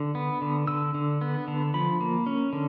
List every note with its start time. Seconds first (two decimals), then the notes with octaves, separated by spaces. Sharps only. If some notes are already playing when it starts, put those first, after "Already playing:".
Already playing: D3
0.15 B3
0.42 D3
0.67 D3 E6
0.94 D3
1.21 B3
1.48 D3
1.74 F3 B5
2.01 A#3
2.27 C#4
2.53 D3